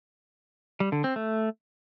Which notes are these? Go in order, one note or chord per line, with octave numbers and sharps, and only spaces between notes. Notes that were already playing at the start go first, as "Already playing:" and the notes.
G3
D3
C4
A3